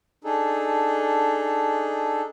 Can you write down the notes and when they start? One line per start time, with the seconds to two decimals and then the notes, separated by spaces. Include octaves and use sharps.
0.24 D4 D#4 G#4 A4